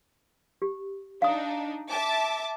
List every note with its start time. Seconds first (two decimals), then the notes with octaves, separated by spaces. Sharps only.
0.62 G4
1.22 D4 D#4 F5 D#6
1.89 E5 A5 D6